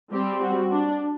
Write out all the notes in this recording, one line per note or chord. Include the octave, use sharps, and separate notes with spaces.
G3 C4 G4
F#4
D4